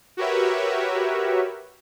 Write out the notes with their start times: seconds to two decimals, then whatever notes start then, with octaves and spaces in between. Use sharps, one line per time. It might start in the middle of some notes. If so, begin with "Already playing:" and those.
0.17 F#4 G4 A#4 B4 C#5 E5